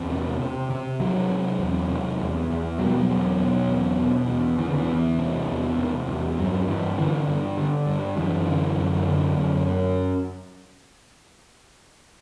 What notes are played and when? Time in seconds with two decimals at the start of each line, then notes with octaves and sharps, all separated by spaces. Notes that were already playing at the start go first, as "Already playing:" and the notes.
Already playing: E2 C4
0.10 C3
0.40 C3
0.70 C3
1.00 C3 F#3
1.29 C3
1.59 E2
1.89 C3
2.19 E2
2.49 E2
2.78 B2 F#3
2.87 G3
2.95 F#3
3.09 E2
3.39 B2
3.69 E2
3.98 B2
4.28 E2
4.58 E2 E3
4.68 D3
4.78 E3
4.88 E2
5.18 C3
5.48 E2
5.77 C3
6.08 E2
6.38 G2 F#3
6.68 G2 E3
6.97 D3 E3
7.28 G2
7.57 D3
7.87 G2
8.17 F#2 E3
8.47 D3
8.77 F#2
9.07 D3
9.37 F#2